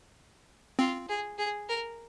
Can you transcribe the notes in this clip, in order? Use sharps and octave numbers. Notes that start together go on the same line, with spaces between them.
C4 F4
G#4
G#4
A#4